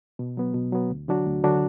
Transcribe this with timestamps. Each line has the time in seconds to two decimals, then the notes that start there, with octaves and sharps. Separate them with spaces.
0.19 B2
0.37 F#3 B3
0.54 B2
0.73 F#3 B3
0.91 D2
1.08 D3 F#3 D4 F#4
1.26 D2
1.44 D3 F#3 D4 F#4